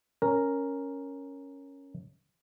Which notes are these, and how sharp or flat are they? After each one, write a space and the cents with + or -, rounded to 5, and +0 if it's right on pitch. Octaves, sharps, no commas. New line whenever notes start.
C#4 +0 A#4 +0